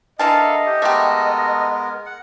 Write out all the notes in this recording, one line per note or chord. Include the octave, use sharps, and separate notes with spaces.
D3 E3 A4 A#4 D#5 F5 A5
G4
G#3 A3 B3 G4 A#4
F#5